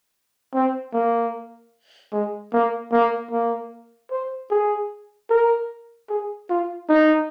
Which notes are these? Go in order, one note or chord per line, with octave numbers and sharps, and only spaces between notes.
C4
A#3
G#3
A#3
A#3
A#3
C5
G#4
A#4
G#4
F4
D#4